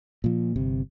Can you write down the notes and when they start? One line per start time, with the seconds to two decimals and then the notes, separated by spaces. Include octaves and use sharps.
0.24 A#2 F3
0.56 G1 C3